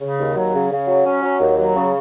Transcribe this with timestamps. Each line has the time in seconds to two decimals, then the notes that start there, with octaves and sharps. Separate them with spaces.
0.01 C#3
0.18 D#2
0.36 F#3
0.53 C#3
0.71 C#3
0.87 F#3
1.04 C#4
1.23 F#3
1.39 D#2
1.57 F#3
1.75 C#3